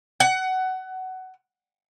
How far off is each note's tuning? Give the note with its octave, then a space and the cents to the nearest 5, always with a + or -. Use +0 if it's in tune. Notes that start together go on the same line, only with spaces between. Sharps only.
F#5 +20